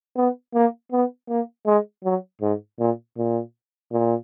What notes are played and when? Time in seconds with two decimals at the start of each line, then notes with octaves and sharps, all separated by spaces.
0.17 B3
0.55 A#3
0.92 B3
1.29 A#3
1.66 G#3
2.04 F#3
2.42 G#2
2.79 A#2
3.17 A#2
3.92 A#2